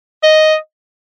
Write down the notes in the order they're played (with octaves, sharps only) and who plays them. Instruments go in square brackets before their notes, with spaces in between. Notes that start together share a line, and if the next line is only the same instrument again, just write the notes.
[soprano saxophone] D#5